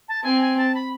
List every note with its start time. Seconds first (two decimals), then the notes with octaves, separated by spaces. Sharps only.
0.08 A5
0.24 C4 G#5
0.41 G#5
0.58 A5
0.74 B5